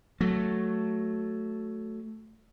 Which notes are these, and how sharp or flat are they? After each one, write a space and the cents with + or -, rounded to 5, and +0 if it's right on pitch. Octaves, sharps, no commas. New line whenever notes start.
F#3 +5 A3 +0